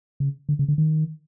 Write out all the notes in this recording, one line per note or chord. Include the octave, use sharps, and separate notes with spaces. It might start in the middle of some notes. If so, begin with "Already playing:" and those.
C#3
D3
C#3
D3
D#3